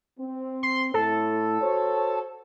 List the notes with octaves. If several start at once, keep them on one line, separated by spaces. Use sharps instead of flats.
C4
C6
A2 A4
F#4 C5 C#5